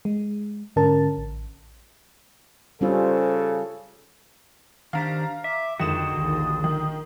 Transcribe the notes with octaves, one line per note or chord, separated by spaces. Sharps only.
G#3
G#2 D3 C#4 A#4 A5
A1
C#3 G3 C#4 F4 A4 C5
D#3 D4 G4 C5 F5 A#5
E5 D6
F2 D3 D#3 G#3 F#4 D#6 E7
A#1 D#2
D#3